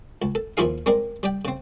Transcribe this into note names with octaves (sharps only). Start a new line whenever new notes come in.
C#2
A4
D#2 F3 E4 F4 G#4 F5
G#3 C4 A#4 D5
G3 D5 G5
C#3 C4